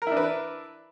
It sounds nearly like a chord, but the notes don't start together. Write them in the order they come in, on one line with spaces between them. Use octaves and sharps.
A#4 E4 D4 B4